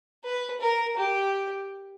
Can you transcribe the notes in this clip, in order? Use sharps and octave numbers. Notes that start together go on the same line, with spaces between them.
B4
A#4
G4